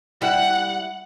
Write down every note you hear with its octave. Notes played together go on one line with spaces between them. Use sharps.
G3 E4 F#5 F#6